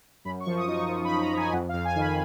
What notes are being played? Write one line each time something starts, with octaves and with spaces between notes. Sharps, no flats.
F#2 B5
C#6
F3
D#6
D#4
C#6
F3
B5
F3
A#5
F3
G#5
F2 F#5
F5
F2
G#5
D#3
B5